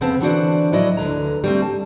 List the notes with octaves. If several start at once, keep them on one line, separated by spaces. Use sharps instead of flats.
F2 C#3 B3 C4 A5
D3 E3 D4 F#4 C5 D5
A2 F3 F#3 E4 D5 D#5
D2 D3 B4 A#5
G3 A3 C4
A5